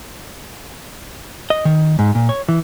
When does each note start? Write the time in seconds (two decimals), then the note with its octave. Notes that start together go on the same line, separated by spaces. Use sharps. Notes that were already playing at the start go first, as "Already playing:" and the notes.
1.50 D#5
1.65 D#3
1.99 G#2
2.15 A#2
2.29 C#5
2.48 E3